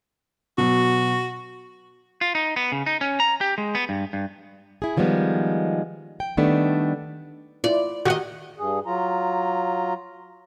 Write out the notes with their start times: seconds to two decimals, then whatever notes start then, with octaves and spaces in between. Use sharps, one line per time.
0.58 B2 F#3 F#4
2.21 F4
2.35 D#4
2.56 B3
2.72 C#3
2.86 D#4
3.01 C#4
3.20 A#5
3.41 G4
3.58 G#3
3.75 B3
3.89 G2
4.13 G2
4.82 E4 G#4
4.97 D#3 F3 G3 G#3 B3
6.20 G5
6.37 D#3 G3 A3 B3 D4
7.64 E4 F4 D5
8.05 D#3 F#4 G4 D#5 F#5
8.58 G2 G#4
8.86 F#3 F4 A#5